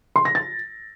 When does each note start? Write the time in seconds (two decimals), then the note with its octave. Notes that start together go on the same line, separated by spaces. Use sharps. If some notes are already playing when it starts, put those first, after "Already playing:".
0.16 C6
0.25 A#6
0.35 A6